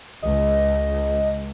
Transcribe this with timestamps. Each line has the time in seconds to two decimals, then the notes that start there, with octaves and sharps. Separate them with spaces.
0.23 C#2 D#5